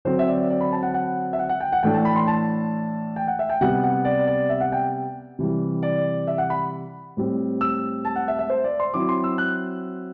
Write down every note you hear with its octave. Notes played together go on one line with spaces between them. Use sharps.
D3 F#3 C4 C5
E5
D5
D5
B5
A5
F#5
F#5
E5
F#5
F#5
G5
F#5
A2 E3 A3 D4 G5
A5
B5
C6
A5
G5
F#5
E5
G5
C3 G3 B3 F#5
F#5
D5
D5
E5
F#5
G5
C3 E3 G3
D5
E5
F#5
B5
A2 G3 C4
E6
A5
F#5
E5
E5
C5
D5
C6
F#3 C4 E4 D6
C6
E6
F#6